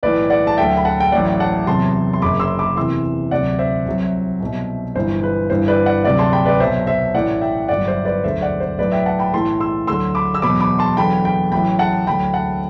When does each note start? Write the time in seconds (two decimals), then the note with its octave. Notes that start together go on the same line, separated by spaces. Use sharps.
0.03 B1 A2 E3 B4 D5
0.30 D5 F#5
0.47 A5
0.57 D2 D3 F#3 E5 G5
0.77 B5
0.85 F#5 A5
1.00 G5
1.12 A1 A2 F#3 D5 F#5
1.40 F#5 A5
1.67 E2 C3 F#3 A5 C6
2.13 C6
2.22 F#1 F#2 F#3 B5 D6
2.40 C6 E6
2.59 B5 D6
2.77 E2 C3 E3 C6 E6
3.31 D2 C3 F#3 D5 F#5
3.59 C5 E5
3.86 C2 C3 F#3
4.40 C2 B2 F#3
4.95 G1 G2 E3 C5
5.23 B4
5.50 G1 G2 E3 C5
5.68 B4 D5
5.86 D5 F#5
6.04 D2 C3 F#3 D5 F#5
6.19 A5 C6
6.32 G5 B5
6.45 B4 D5
6.60 B1 B2 F#3 C5 E5
6.87 C5 E5
7.14 A1 A2 E3 D5 F#5
7.41 E5 G5
7.69 G1 G2 F#3 D5 F#5
7.87 C5 E5
8.05 B4 D5
8.24 E1 D2 D3 F#3 C5 E5
8.42 D5 F#5
8.60 C5
8.78 B1 A2 F#3 B4 D5
8.92 E5 G5
9.06 F#5 A5
9.19 G5 B5
9.33 B1 A2 E3 A5 C6
9.60 C6 E6
9.87 D2 D3 F#3 C6 E6
10.15 B5 D6
10.34 E6
10.42 E2 B2 F#3 B5 D6
10.60 B5 D6
10.79 A5 C6
10.97 E2 D3 F#3 G5 B5
11.25 G5 B5
11.52 A1 A2 F#3 G5 B5
11.79 F#5 A5
12.07 D2 D3 F#3 G5 B5
12.34 F#5 A5